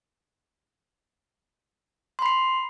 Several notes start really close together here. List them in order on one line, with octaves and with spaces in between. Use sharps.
C6 B5 C7